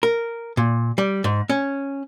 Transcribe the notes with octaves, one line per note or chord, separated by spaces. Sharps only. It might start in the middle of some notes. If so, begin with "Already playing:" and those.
A#4
A#2
G3
G#2
C#4